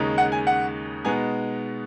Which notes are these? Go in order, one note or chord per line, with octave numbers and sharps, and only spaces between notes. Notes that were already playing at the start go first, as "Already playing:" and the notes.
Already playing: D#2 C#3 G#3 D#4
F#5
G#5
F#5
B2 G#3 B3 D#4 G#5